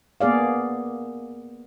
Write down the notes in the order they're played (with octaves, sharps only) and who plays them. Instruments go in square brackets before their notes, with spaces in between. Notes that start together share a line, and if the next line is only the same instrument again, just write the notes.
[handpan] A#3 B3 G#4 D5 F5